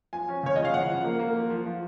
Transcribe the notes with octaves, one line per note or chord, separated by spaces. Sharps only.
F3 G#5
C#4
C#3 C#5
F3 D#5
F5
C#3 F#5
F3
A#3
A#3
F3
F3
F3